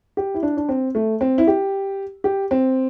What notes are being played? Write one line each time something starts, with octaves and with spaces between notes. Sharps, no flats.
G4
E4
D4
D4
C4
A3
C4
E4
G4
G4
C4